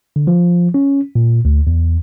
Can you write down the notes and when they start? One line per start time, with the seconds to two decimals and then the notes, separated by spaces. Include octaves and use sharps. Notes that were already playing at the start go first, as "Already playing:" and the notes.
0.16 D3
0.27 F3
0.74 C#4
1.15 A#2
1.45 D2
1.67 E2